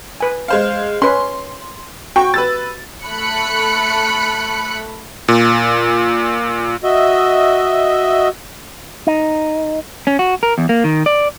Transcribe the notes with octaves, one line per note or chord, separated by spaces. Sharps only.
B4 G#5
G#3 C5 F5
C#4 B4 C6
F#4 G5 C#6
B4 E6 A6
A3 B5 F#6 C#7
A#2
F#4 D#5 E5
D#4
C#4
F#4
A#4
E2
A#3
D#3
D5